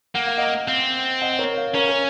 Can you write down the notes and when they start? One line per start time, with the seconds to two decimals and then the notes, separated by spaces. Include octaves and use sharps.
0.15 A#3 F#5
0.27 F5
0.37 D#5 F#5
0.68 C4
1.22 D#5 F#5
1.39 A#4 C#5
1.57 C#5 F5
1.75 C#4 A#4 C#5
1.88 A#4